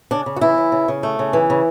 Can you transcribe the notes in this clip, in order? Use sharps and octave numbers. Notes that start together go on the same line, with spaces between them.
C#3 D4
C#3
F#4
E3 E4
C#3
C#3
C#3
A3
C#3
E3
C#3